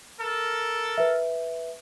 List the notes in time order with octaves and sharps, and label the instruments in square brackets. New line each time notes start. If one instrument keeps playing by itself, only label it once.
[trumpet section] A4 A#4
[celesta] B4 E5